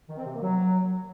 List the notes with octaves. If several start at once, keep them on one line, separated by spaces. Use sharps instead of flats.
D#3
C4
C3
A#3
F#3